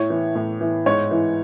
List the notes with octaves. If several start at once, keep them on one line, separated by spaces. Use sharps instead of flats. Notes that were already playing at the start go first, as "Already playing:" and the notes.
Already playing: A2 C#5
E3
A2
E3
G#2 C#5
E3